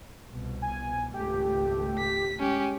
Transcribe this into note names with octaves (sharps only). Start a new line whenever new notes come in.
C2 B2
G#5
G#1 C#2 A3 G4
B6
G#3 C#4 G4